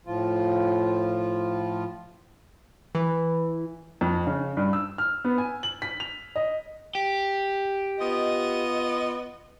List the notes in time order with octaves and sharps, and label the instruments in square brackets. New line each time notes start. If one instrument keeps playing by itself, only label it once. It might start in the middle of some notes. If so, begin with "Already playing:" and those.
[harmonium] A2 F3 F4
[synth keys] E3
[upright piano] F2
C#3
G2
E6
F6
B3
G#5
F#7
B6
F7
D#5
[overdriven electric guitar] G4
[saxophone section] B3 F4 D#5